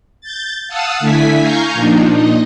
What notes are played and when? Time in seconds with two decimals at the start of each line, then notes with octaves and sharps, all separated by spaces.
0.21 G6 A6
0.68 F5 F#5 A5 D#6 E6
1.00 D3 A3 E4 G#5 B6
1.40 F5 G#5 A#5 C#6 G6
1.73 A#2 F3 D4 D#4
2.13 A#2 D#4 D#5